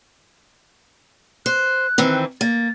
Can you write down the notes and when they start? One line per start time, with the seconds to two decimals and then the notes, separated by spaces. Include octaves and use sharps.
1.46 C5 F#6
1.98 D#3 E3 C4
2.41 A#3 A6